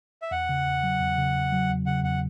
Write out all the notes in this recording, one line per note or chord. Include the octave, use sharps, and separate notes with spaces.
E5
E2 F#5
C#3
E2
F#3
E2
C#3
E2
F#3
E2
C#3 F#5
E2 F#5